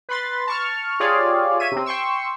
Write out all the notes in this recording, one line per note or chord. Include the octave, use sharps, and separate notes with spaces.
B4 B5 C6 A6
A5 C#6 F6
F4 G4 G#4 C#5 D5 F5
C#5 E5 D#7
C3 C4
G5 C6 C#6 E6